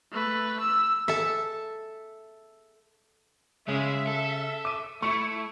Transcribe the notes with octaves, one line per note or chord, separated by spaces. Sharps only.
A3 B4
E6
A4 E5
C#3 G#3 E5
A4
D6 D#7
A3 E4 C#6 C#7